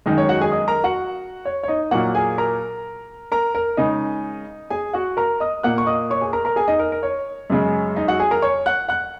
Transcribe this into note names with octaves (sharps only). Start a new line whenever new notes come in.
F#2 D#3 G#3 D#4 D#5
C#5
F#4 F#5
G#4 G#5
D#5 D#6
A#4 A#5
F#4 F#5
C#5
C#5
D#4 D#5
A#2 F#3 A#3 F#4 F#5
G#4 G#5
A#4 A#5
A#4 A#5
A#4
C#3 G#3 D#4 D#5
G#4 G#5
F#4 F#5
A#4 A#5
D#5 D#6
A#2 A#3 F#5 F#6
C#6
D#5 D#6
C#5 C#6
G#4 G#5
A#4 A#5
A#4 A#5
G#4 G#5
D#4 D#5
A#4
A#4
C#5
F#2 C#3 G#3
D#4 D#5
F#4 F#5
G#4 G#5
A#4 A#5
C#5 C#6
F#5 F#6
F#5 F#6